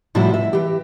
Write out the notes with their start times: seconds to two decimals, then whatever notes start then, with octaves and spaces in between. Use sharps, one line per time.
0.15 A2 C3 F3 G3 E4 F#4
0.34 E5
0.53 E3 G4